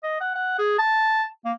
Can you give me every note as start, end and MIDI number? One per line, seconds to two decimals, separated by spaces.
0.03 0.16 75
0.20 0.32 78
0.35 0.55 78
0.58 0.74 68
0.78 1.24 81
1.45 1.52 58